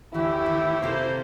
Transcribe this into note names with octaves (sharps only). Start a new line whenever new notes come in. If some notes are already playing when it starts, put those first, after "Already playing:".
D2 A2 E3 E4 G4
D#3
C3 A#3 G4 A4 C5